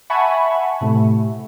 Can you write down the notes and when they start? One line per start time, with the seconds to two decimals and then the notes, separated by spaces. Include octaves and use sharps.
0.10 E5 F#5 G#5 A5 B5 C#6
0.81 A2 C3 A3